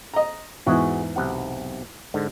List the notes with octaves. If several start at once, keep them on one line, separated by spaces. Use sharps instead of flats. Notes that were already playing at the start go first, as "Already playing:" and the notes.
D#5 A#5
E2 G#2 F#4 G#4
B1 C3 F#5
G#2 D3